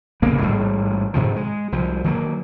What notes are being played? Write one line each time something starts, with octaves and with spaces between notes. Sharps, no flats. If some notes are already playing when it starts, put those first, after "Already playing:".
C2 C#3 A#3 B3
A1 G#2 G3
G#2 C3 D#3 F3
G#3
C2 F3
D#3 F#3 G3 A#3